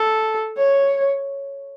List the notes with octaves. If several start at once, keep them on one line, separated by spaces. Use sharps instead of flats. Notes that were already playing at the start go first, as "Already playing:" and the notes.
Already playing: A4
C#5